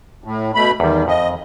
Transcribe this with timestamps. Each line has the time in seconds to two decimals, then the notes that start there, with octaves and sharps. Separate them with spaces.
0.24 A2
0.55 B2 A3 B5
0.80 E2 D#3 G3
1.08 F2 D#5